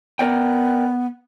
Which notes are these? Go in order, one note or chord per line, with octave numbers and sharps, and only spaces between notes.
B3 A#4 D5 G5